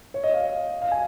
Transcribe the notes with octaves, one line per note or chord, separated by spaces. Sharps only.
C#5
D#5
F5
F5
G#5